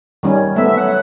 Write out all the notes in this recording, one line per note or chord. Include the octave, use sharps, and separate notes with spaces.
D#3 G3 C#4
A3 B3 E5
F#3 F#5